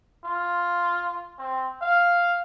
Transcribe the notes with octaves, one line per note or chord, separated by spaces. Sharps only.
F4
C4
F5